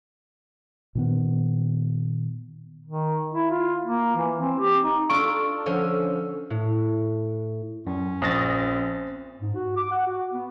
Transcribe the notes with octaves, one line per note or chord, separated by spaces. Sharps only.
A#2 D#3 B3
D#3
E4
F4
A#3
E3
C4
G4
D#4
D4 F4 A4 C#6 D7
D3 F3 C#4
A2
F#2 C#4
A#1 C4 C5 D#6 A6 A#6
G#2
F#4
D6
F#5
F#4
B3